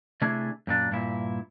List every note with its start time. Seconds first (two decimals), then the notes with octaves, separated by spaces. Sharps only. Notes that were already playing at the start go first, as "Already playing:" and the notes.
0.22 C3 A3 D4 E4 G#4
0.67 F#2 A#2 D4
0.91 G2 A#2 E4